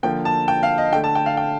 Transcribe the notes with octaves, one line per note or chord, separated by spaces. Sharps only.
D3 F3 A#3 G5
A5
G5
F5
D#5
D3 A3 G5
A5
G5
F5
G5